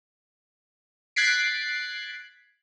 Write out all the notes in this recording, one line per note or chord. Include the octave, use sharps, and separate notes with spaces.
F#6 G#6 A6 B6 C7 D7